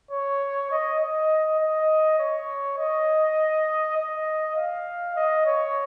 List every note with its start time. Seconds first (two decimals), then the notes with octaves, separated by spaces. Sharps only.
0.11 C#5
0.71 D#5
1.00 D#5
1.60 D#5
2.19 C#5
2.78 D#5
3.97 D#5
4.56 F5
5.16 D#5
5.46 C#5